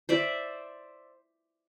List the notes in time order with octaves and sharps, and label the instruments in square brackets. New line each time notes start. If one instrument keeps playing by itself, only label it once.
[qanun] C5 D5 E5